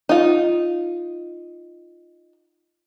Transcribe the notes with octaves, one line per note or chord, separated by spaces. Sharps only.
D#4 F4